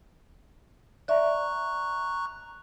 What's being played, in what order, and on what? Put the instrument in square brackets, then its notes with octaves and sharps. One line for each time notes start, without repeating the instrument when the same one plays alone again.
[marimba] D5 E5 [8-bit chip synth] A#5 C#6 F#6